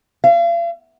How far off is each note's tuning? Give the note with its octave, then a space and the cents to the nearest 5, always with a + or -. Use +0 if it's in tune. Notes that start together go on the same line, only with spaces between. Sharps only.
F5 -40